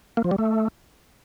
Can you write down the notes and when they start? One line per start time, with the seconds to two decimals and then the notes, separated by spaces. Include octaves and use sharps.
0.17 A#3
0.24 F3
0.31 G3
0.38 A3